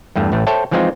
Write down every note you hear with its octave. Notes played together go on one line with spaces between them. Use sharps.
E2 G2 A3
A1 A2 A3
A4 C5 C#5 E5 G5 A5
E3 F3 G#3 C4 D#4 F4